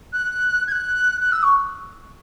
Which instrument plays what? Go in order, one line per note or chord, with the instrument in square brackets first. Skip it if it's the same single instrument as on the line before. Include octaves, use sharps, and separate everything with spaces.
[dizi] F#6
G#6
F#6
F#6
E6
C#6